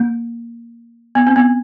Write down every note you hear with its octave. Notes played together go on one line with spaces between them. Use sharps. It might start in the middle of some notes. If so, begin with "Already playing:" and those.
Already playing: A#3
B3
C4
B3